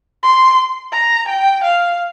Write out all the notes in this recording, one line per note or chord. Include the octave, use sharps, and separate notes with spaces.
C6
A#5
G5
F5